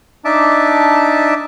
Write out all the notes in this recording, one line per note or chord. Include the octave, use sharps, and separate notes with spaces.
D4 D#4 E5 A5 D6